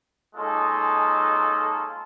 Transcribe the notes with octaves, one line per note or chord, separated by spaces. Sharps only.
G#3 A#3 C#4 D#4 F4 A4